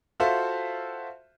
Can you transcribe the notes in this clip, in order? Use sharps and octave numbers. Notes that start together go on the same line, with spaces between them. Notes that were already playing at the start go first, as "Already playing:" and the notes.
F4 F#4 A4 C5 E5 F5